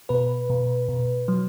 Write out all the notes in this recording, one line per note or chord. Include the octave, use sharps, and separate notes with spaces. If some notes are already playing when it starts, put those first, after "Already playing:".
B2 B4
B2
B2
F#3